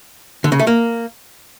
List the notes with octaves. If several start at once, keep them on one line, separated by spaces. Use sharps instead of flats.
D3
C#3
A3
A#3